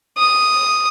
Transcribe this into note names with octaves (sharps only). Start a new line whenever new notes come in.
D#6